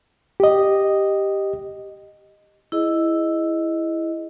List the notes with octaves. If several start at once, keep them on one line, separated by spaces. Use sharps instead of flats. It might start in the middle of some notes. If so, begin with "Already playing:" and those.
G4 D#5
E4 G#4 D#5